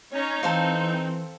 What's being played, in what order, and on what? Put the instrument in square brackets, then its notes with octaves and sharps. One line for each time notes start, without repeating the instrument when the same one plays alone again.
[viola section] C#4 C#5 A#5 [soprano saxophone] D#4
[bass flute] E3 [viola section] C4 [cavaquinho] A4 C5 F5